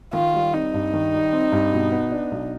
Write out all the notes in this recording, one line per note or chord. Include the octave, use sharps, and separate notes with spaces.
D#3 F4
G3
C4 D#4
G2
D#3
G3
C4
G2
B2
B3
D4
B1